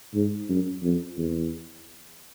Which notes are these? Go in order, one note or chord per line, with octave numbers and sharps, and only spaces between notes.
G#2
F#2
F2
E2